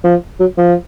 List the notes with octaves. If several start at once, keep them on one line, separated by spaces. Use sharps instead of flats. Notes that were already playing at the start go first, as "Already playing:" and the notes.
F3
F#3
F3